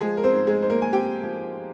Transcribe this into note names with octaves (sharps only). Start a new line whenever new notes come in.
F3 G#3 G#4
A#4
C4 C5
G#2
G#3 G#4
D#4 C5
A#3 A#4
G#5
C4 G4 G5
F3